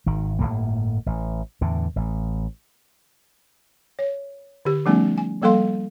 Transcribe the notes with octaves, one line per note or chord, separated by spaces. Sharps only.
G#1 D#3
G1 F2 A2 A#3
A1
E2 A2 D3
A1
C#5
D3 G4
F3 G3 A3 B3 C#4 D#4
G#5
F3 G3 A#3 A4 F5 C6